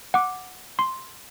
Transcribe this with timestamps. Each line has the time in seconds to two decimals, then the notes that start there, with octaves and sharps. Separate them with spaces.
0.14 F#5 D6
0.79 C6